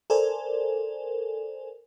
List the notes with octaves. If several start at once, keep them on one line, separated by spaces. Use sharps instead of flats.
A4 A#4 C5 D5 G#5